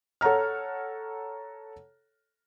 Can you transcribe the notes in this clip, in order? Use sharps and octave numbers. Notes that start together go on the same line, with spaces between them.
A4 C#5 F#5 A#5 F6